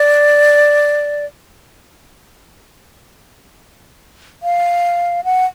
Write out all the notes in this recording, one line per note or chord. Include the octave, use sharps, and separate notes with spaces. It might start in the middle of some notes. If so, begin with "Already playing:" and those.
Already playing: D5
F5
F#5